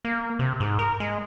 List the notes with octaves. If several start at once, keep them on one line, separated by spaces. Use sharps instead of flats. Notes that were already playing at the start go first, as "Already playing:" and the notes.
A#3
C3
G#2
A#4
G#3